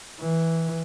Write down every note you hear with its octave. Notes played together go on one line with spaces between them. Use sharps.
E3